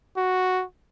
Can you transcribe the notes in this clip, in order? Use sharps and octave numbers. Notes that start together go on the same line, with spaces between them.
F#4